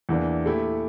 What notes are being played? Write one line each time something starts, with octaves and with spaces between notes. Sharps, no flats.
E2 E3 A#3 D4
A#2 A3 E4 G4